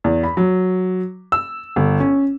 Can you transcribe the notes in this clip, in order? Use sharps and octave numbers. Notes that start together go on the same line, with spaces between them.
E2
B5
F#3
E6
G1
C#4